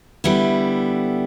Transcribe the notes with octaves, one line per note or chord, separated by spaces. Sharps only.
D3 G3 B3 E4